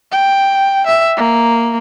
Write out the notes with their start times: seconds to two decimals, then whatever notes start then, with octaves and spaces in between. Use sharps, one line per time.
0.12 G5
0.86 E5
1.17 A#3